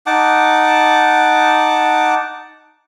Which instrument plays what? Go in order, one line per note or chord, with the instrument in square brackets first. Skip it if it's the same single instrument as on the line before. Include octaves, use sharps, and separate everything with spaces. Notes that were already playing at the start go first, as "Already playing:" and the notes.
[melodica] D#4 F#5 A5 D6